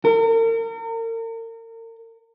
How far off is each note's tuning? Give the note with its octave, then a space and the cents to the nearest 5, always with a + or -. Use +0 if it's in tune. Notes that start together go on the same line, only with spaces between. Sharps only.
A#4 -40